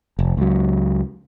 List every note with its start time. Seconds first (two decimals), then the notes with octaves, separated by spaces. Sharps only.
0.19 F1
0.37 C#2 F#3